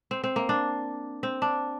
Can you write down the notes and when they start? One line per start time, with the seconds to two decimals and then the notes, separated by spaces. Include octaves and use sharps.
0.11 C4
0.24 C4
0.36 A#3
0.49 D4
1.23 C4
1.42 D4